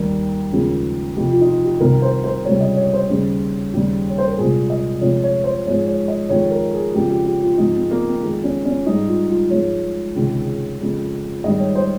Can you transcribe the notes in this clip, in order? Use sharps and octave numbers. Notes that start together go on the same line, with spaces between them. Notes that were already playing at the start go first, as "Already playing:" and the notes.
Already playing: D#2 D#3 G3 A#4
D#2 C#3 F3 G#3
F2 C3 F3 G4
F4
D#4
F4
G4
C2 C3 D#3 A#4
C5
C5
C#2 C3 G3 C#5
D#5
C#5
C5
D#2 C#3 G3
D#2 C#3 G3
C#5
C5
A#4
C2 A#2 G#3 G#4
D#5
F2 C3 F3 G#3 C#5
C#5
C5
G#2 F3 G#3 C#5
C#5
D#5
F2 D#3 G#3 C#5
A#4
G#4
F2 C#3 F3 G#3 G4
G4
G4
F4
G#2 F3 G#3 D#4
C4
A#3
C4
F2 D#3 G#3
C#4
C#4
G#2 G3 D#4
F4
F4
G#2 F3 G#3 C#5
C#2 C3 D#3 G#3
F2 C#3 G#3
G#2 D#3 G3 D#5
C#5
C5